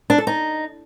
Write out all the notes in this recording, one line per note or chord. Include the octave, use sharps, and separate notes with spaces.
D4
A4
D#4